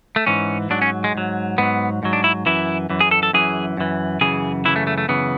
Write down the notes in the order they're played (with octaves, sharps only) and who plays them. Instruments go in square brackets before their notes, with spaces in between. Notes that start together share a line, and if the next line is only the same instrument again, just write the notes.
[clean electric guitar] A3
G#2 E3 C#4
G#2 F#3 D4
C#4
G#3
G#2 F#3
G#2 F#3 B3
G#2 F#3
D4
E4
F#2 E3 E4
F#2 E3
G#4
A4
A4
F#2 E3 G#4
F#2 E3
F#2 C#3 E3 G#4
F#2 C#3 E3 E4
A3
A3
A3
F#2 C#3 E3 B3